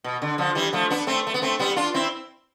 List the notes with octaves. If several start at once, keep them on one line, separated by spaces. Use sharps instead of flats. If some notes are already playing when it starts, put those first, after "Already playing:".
B2
D3
D3 F3
E3 G3
F3 A3
B3 D4
A3 C4
A3
B3
A3 C4
G3 B3
D4 F4
C4 E4